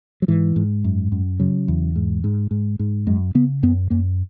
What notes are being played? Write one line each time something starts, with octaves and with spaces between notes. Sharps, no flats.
F#3
G#2 E3
G#2
F#2
F#2
C#3 F#3
E2
G#2
G#2
G#2
G#2
F#2 G#3
C#3 B3
F#2 B3
F#2 A#3